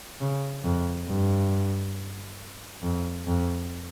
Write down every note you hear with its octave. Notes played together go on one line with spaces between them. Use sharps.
C#3
F2
G2
F2
F2